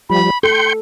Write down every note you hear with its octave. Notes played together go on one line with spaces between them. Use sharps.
F3 G3 B5
A4 G5 C6 G6 C#7